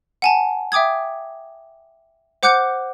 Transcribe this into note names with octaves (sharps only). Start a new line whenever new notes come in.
F#5 G#5 A5
E5 G5 D6 D#6 G#6
C5 F#5 D6 F#6 G6 C#7